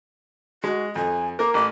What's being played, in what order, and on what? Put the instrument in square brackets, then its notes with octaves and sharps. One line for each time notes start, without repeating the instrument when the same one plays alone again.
[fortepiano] G#3 [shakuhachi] F#4
[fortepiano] F2 [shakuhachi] G#5
[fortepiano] A#3 A#4 [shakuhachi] D6
[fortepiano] A1 [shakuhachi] D6